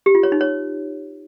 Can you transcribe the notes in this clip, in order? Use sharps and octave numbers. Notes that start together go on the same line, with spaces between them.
G4
F4
C#5
D#4
C#5